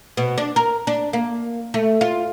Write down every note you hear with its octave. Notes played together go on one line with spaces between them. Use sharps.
B2
D4
A#4
D4
A#3
A3
F4